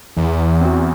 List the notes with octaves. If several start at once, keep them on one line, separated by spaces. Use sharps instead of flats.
E2 E3
C4 F#4